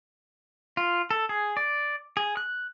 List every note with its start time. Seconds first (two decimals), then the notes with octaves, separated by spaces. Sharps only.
0.77 F4
1.11 A4
1.29 G#4
1.57 D5
2.17 G#4
2.37 F#6